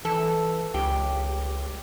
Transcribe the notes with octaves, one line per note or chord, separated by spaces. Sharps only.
E3 A4
C#2 G4